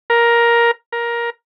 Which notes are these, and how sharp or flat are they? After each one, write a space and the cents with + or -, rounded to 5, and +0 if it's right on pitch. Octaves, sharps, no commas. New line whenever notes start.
A#4 +10
A#4 +15